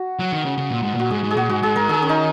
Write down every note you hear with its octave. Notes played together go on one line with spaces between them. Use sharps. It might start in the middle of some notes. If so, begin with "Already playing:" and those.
Already playing: F#4
F#3
D#3
C#3
C#3
A#2
G#2
A#2 F#4
G#2 G#4
G#2
G#4
A#2 F#4
G#2 F#4
G#2 G#4
G#2 A#4
D#3 G#4
C#4
D#4